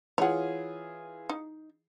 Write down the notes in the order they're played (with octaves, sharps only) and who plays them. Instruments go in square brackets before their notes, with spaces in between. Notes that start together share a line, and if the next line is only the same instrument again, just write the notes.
[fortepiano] E3 F4 G#4 [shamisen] C#5 F#5
[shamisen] D#4